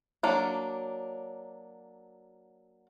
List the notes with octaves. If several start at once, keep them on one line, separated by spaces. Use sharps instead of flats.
F#3 A#3 D4